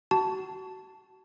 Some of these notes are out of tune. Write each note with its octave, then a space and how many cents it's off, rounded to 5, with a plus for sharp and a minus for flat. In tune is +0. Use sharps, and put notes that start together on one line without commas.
F#4 +30 A5 +0